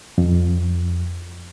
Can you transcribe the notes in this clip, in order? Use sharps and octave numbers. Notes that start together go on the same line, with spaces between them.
F2